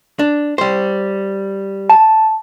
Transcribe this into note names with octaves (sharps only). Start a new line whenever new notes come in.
D4
G3 C5
A5